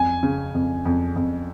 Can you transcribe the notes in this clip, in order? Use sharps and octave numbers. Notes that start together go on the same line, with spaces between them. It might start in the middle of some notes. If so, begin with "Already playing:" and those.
Already playing: F2 G#5
C#3
F2
F2
F2